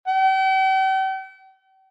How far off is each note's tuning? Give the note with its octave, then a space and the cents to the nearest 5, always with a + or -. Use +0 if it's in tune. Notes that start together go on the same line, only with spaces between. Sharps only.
G5 -45